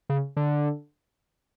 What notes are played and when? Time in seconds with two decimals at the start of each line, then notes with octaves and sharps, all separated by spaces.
0.10 C#3
0.37 D3